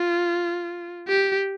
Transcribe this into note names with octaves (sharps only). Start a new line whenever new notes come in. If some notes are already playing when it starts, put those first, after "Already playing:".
Already playing: F4
G4